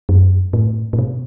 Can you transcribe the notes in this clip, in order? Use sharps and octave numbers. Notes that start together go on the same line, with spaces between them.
F#2
A2
A2
B2